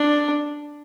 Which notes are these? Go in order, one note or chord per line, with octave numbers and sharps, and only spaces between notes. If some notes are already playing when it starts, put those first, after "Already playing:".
Already playing: D4